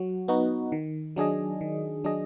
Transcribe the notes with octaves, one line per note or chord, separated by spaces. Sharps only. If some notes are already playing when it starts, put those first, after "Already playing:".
Already playing: F#3 F#4
B3 D#4 F#4
D#3
F#3 D4 G#4 D#5
D#3
F#3 D4 G#4 D#5